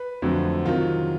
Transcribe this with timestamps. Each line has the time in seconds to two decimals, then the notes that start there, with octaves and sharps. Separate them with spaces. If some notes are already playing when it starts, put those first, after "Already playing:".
Already playing: B4
0.22 F2 D3 F#3 A3
0.66 C3 D#3 F#3 F4